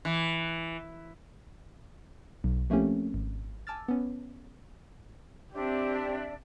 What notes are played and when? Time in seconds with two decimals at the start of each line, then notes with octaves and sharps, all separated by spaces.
0.05 E3
2.44 B1
2.70 F3 A3 A#3 C4 C#4 G4
3.14 G#1
3.67 G#5 A5 D6 E6 F6 A6
3.88 B3 C#4
5.53 C4 D4 G4 D5 E5